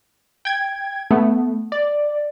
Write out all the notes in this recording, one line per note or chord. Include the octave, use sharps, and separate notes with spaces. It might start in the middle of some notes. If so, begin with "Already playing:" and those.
G5 G#6
A3 B3
D5